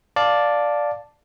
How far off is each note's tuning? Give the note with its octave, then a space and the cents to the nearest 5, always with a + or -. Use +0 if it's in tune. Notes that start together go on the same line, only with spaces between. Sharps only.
D5 +0 F5 +10 A5 +0